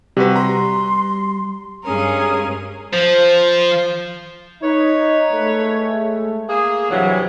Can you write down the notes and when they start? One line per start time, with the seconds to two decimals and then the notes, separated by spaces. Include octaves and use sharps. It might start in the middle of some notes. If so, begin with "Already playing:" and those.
0.17 C3 G3 F#4 B4
0.36 A#5 C6
1.85 G2 G#3 C#4 G#4 A#4 D#6
2.93 F3 C5
4.63 D#4 B4 C#5
5.33 G#3 A3
6.49 A#3 G#4
6.91 G2 C3 E3 F#3